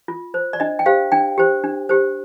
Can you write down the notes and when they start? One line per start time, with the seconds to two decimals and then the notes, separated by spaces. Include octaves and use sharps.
0.08 F4
0.34 C5
0.53 D5
0.60 D4 D#5
0.79 G5
0.86 G4 C5 F5
1.12 D4 G5
1.38 G4 C5
1.64 D4
1.89 G4 C5